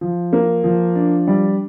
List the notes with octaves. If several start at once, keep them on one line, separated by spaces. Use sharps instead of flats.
F3
A#3
F3
D4
G3